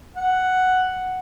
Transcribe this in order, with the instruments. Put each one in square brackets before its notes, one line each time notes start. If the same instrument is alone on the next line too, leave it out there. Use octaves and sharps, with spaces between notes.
[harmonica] F#5